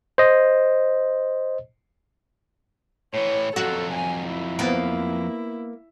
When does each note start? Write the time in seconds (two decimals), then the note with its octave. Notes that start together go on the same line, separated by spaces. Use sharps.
0.18 C5 D#5
3.14 A2 E3 C#5
3.56 F2 F#3 F#4 A4
3.94 G#5
4.27 E4
4.59 A#3 B3